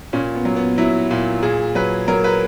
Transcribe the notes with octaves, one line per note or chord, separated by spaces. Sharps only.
A#2 C#4
B3
F#3
B3
F#3 E4
A#2
A#2 G#4
F#3 B4
F#3 A#4
B4